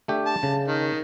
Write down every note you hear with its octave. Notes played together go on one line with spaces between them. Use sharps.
A3 D4 G4
A5
C#3
D#3